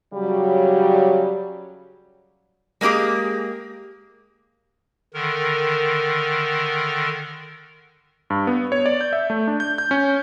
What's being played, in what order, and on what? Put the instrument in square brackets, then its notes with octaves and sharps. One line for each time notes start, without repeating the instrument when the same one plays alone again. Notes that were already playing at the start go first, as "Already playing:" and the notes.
[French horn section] C#3 F#3 G3
[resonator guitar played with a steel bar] G#3 A#3 C4 G4 G#4
[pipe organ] D3 D#3 A#4
[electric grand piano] G2
B3
C#5
D5
G6
E5
A3
D4
G6
G6
C#4